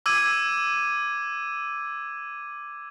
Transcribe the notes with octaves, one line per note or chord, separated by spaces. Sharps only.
D6 E6 G#6 D#7